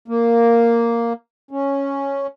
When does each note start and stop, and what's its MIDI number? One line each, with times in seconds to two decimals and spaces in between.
0.08 1.13 58
1.51 2.27 61